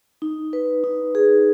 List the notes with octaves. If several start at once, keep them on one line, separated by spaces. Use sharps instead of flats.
D#4
B4
D#4
G#4